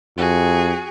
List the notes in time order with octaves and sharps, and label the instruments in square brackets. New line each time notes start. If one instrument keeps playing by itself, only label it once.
[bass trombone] F2 [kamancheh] F#4 G#4